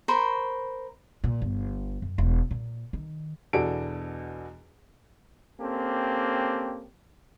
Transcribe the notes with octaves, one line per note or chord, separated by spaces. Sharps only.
A#4 C5 B5 C#6
A#2
G1
F#2
E1
A#2
D#3
E2 B2 D4 F#4 A4 D7
A#3 C4 C#4 G4 A4